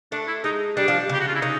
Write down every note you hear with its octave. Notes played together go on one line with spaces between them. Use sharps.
A3 D4
E4
G#3 D#4
G3 D4
F3
C#3 G4
F#4
F4
E4
C#3 D#4